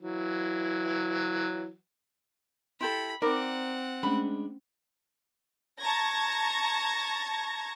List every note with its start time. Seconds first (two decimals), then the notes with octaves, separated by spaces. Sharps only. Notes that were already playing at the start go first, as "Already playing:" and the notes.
0.01 E3 F#3
2.81 E4 G4 A4 B5 C6
3.22 C4 D#4 A#4 D5 F#5 B5 D6
4.03 G#3 A3 C#4 D4 B5
5.81 A5 A#5 C#6 G#6 A#6